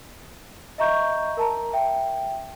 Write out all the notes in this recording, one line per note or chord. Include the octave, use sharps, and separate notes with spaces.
D#5 E5 A#5 C#6 G6
A#4 A5 A#5
E5 G5